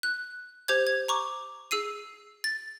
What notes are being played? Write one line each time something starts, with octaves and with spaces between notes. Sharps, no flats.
F#6
G4 C5 G6 G#6
G#6
A#5 C#6 D6
G#4 E6 C7 D#7
A6